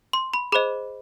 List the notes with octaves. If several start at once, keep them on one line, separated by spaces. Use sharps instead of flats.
C6
B5
G#4 C5 D#5 B5